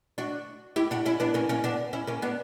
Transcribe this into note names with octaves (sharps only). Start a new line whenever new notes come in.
D4 F#4
E4 G4
D4 F#4
C#4 E4
B3 D4
A#3 C#4
A#3 C#4
B3 D4
C#4 E4
A#3 C#4
B3 D4